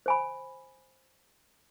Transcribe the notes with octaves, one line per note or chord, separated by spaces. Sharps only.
C5 G#5 B5